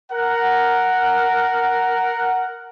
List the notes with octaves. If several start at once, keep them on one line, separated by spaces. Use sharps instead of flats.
A#4 F#5